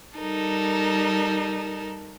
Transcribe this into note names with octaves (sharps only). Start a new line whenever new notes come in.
G3 D#4 A4 A#4